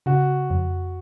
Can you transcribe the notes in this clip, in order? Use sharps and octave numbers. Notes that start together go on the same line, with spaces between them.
C#3 F#4
F2